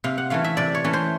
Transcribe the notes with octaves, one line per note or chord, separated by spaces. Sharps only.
C3 F5
F#5
E3 A3 C#4 F5
E5
C3 D5
C#5
E3 A3 C#4
C5